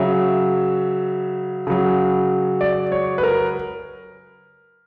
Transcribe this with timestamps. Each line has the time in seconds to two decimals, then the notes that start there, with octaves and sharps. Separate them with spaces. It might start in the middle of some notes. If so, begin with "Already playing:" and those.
Already playing: C#3 F#3 E5
1.67 C#3 F#3
2.61 D5
2.92 C#5
3.18 B4
3.23 A#4